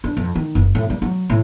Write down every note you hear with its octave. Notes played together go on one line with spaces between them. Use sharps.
D4
F2
D#3
F#1
A2
G3
F#3
A2